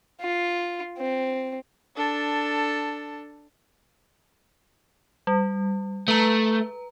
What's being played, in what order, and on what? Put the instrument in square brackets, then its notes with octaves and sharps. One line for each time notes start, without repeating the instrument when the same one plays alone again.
[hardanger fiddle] F4
C4
[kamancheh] D4 A4
[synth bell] G3
[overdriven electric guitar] A3 [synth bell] B4 A#5